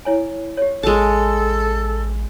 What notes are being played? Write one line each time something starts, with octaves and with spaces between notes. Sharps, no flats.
E4 C#5 G#5
G4 C#5
A1 G#3 A4 A5